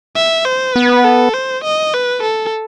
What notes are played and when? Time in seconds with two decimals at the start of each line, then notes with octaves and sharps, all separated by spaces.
0.16 E5
0.45 C5
0.75 B3 B4
1.04 A4
1.34 C5
1.64 D#5
1.94 B4
2.23 A4